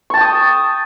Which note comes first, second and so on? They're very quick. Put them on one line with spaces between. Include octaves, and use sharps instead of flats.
C#6 A5 G5 D#6